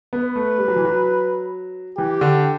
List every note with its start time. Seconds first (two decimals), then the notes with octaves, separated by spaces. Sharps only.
0.13 B3
0.24 B4
0.36 A3
0.58 G3
0.68 F#3
0.76 E3
0.85 F#3
1.97 E3 G4
2.21 D3